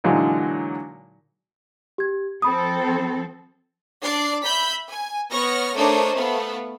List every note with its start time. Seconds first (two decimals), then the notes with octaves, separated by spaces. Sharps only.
0.04 A#2 D3 E3 F#3 G#3 D#4
1.98 G4 G#6
2.42 F3 C4 A4 B5 D#6
4.03 D4 D5 C7
4.43 E5 B5 G6 B6
4.90 G#5
5.31 B3 C#5 C#6 F6 A#6
5.76 A3 D4 D#4 A#4 C5 C#5
6.14 A3 B3 F5